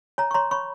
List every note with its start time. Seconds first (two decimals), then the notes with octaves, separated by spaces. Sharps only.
0.18 C#5 G#5 A#5
0.31 C#6
0.34 C#5 A#5 C6
0.51 C#5 B5 C#6